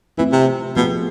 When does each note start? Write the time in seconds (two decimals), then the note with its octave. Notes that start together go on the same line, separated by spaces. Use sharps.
0.18 E3 A3 C4 F4
0.32 C3
0.76 B2 F3 A3 C4 F4 G#4